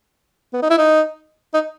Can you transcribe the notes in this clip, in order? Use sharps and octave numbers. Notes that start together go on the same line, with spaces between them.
B3
D#4
E4
D#4
D#4